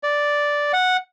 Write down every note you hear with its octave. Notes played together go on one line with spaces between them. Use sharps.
D5
F#5